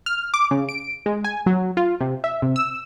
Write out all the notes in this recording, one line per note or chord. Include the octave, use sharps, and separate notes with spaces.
F6
D6
C#3
D7
G#3
G#5
F#3
F4
C3
E5
C3
E6